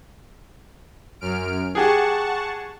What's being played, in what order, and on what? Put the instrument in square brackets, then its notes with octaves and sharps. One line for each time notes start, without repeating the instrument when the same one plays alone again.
[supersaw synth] F#2 F6 D7
[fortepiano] G4 G#4 [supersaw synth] F#5 A5 C#6